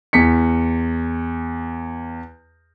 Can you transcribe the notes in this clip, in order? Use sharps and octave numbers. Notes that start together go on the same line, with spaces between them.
E2 B6 C#7